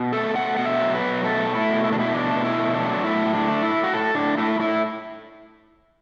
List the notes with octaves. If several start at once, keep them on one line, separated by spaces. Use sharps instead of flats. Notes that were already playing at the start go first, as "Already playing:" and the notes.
Already playing: B2
A3 A4
A3 F#5
B2 F#5
E5
F#3
B4
B2
A3 A4
A3
E4
B2
E4
B2 D4
E4
A3 D4
B2
E4
A3
D4
F#3
A3 E4
A2
D4
A3
E4
A2
F#4
A2 A4
A2 D4
A3 E4
A2 E4